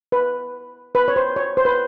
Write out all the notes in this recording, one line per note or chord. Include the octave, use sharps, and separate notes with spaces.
B4
B4
C#5
C5
C#5
C5
B4